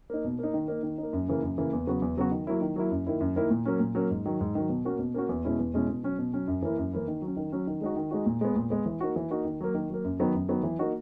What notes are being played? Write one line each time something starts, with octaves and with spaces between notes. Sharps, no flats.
A#3 D#4
B2
A#3 D#4
D#3
A#3 D#4
D#3
D#4
A#3
F#2
C#3 E3 A#3
F#2
C#3 E3 A#3
E2
C#3 F#3 B3 F#4
E2
C#3 F#3 B3 F#4
D#3
F#3 A#3 E4
D#3
F#3 A#3 E4
F#2
D#3 A#3 E4
F#2
D#3 A#3 E4
A#2
F#3 A#3 C#4
A#2
F#3 A#3 C#4
G#2
D#3 F#3
G#2
D#3 F#3
B2
A#3 C#4 F#4
B2
A#3 C#4 F#4
E2
B2 G#3 C#4 E4
E2
B2 G#3 C#4 E4
B2
F#3 C#4
B2
F#3 C#4
F#2
E3 A#3 E4
F#2
E3 A#3 E4
D#3
F#3
C#4
D#3
F#3 C#4
D#3
G#3 D#4 F#4
D#3
G#3 D#4 F#4
A#2
G#3 B3
A#2
G#3 B3
E3
A#3 D#4 F#4
E3
A#3 D#4 F#4
D#3
F#3 A#3
D#3
F#3 A#3
F#2
D#3 F#3 B3
F#2
D#3 F#3 B3
E3
A#3 D#4 F#4